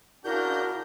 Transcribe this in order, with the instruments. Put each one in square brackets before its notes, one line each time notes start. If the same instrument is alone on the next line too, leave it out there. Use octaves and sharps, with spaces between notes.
[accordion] C#3 D4 G6 [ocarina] E4 [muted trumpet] F#4 [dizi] A#4